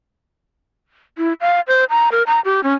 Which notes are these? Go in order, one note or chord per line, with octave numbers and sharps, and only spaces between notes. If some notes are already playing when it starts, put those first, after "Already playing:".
E4
F5
C5
A#5
A#4
A#5
G4
C#4